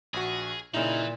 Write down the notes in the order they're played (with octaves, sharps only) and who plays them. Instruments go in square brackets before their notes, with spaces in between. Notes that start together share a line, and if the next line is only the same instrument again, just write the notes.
[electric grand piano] A#1 F#4 [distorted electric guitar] G#4
[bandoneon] A#2 [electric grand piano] C#3 D#4 [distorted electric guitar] E3 [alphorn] E4